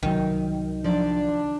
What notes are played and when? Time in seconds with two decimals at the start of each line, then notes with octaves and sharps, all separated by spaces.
0.03 C2 D#3 F#3
0.84 F3 D4 D5